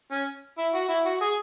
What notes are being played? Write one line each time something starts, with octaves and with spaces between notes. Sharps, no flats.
C#4
E4
F#4
E4
F#4
G#4